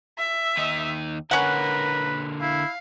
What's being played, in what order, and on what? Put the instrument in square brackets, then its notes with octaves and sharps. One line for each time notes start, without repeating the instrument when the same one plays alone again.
[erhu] E5
[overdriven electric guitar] D#2 D#4
[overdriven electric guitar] D3 A#3 [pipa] C#4 F#5 [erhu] A#4 [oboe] B4
[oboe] E4 [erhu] F5